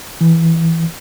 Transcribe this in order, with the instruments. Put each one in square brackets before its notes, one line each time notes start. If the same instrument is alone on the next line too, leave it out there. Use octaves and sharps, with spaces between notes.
[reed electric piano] E3